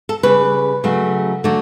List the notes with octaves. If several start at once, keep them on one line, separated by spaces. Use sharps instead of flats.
A4
C#3 G3 B4
C#3 F#3 A3
D3 F#3 A3